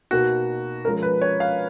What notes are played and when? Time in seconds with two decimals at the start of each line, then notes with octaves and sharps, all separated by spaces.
0.11 B2 A#3 D#4 F#4
0.85 F3 G#3 C#4 A#4
1.03 B4
1.22 C#5
1.40 F5